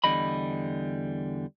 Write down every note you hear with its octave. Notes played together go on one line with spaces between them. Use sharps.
E2 D3 G3 D#5 B5